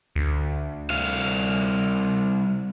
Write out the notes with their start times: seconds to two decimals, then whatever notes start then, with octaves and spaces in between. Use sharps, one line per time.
0.16 D2
0.90 C2 F5